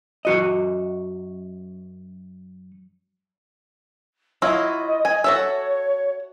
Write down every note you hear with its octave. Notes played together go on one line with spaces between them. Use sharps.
F#2 F#4 D#5
F#3 E4 F4 D#5
G#5
F#4 A4 C#5 E5